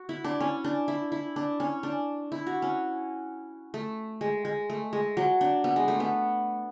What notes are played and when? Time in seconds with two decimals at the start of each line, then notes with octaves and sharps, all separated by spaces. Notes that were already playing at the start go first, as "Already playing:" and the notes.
Already playing: F#4
0.09 E4
0.24 D4
0.40 C#4
0.64 D4
0.88 E4
1.12 E4
1.36 D4
1.60 C#4
1.83 D4
2.32 E4
2.47 F#4
2.62 C#4
3.74 A3
4.21 G#3
4.45 G#3
4.70 A3
4.93 G#3
5.17 F#3
5.41 D4
5.64 B3
5.76 G#3
5.88 A3
6.00 B3